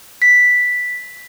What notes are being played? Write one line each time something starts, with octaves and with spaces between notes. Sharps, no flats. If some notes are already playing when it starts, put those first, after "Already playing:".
B6